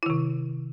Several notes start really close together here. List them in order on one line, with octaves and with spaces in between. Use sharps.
E4 D#3 C3